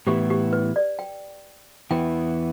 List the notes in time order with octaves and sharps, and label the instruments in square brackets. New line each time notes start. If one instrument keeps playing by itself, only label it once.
[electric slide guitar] A2 E3 B3 E4 [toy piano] G4
[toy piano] G4
B4
D5
G5
[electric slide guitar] E2 E3 B3 E4 [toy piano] G5